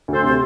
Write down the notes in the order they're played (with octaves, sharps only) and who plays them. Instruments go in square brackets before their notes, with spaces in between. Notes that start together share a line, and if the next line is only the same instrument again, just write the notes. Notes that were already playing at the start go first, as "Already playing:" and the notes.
[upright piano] D2 [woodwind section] A4 C5
[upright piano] C3 [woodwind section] C5